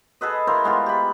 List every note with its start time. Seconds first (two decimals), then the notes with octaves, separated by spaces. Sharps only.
0.21 G#4 A4 B4 D#5
0.47 E4 A#4 C5 F5
0.64 G#3 B3 F4 G4
0.86 G4 B5